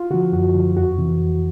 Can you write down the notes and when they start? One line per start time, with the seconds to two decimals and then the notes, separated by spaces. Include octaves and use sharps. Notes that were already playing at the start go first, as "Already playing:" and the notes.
Already playing: F4
0.10 D3 F3 F#4
0.32 F#2 F#4
0.54 D3 F3
0.77 F2 F#4
0.98 C3 E3
1.21 F2